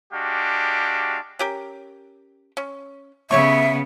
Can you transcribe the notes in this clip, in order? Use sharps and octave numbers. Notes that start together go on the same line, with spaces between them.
G#3 D4 F#4 G4 F5
C#4 G4 A#4
C#4
C#3 G3 B3 C#5 E5 C#6